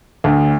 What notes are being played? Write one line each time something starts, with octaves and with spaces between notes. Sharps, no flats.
D2